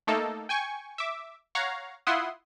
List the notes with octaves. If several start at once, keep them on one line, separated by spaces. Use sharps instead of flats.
A3 A#3 D#4 A4
G5 G#5 C#6
E5 D6
C#5 F5 F#5 A#5
E4 F4 F#5 C6 D#6